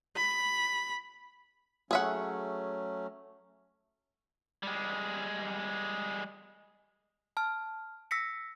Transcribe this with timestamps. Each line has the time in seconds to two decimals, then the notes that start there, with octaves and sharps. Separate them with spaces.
0.16 B5
1.91 F#3 A3 C#4 G#4 E5 F#5
4.63 G3 G#3
7.37 A5 F6
8.11 E6 A#6 B6 C#7